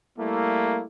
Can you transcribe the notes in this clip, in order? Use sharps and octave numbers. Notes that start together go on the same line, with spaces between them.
G3 A3 A#3 E4